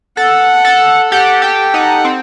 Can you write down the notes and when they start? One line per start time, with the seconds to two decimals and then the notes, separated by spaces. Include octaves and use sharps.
0.17 A4 F#5
0.65 A4
1.12 G4 F#5
1.42 G4 G5
1.74 D#4 F#5
2.05 C4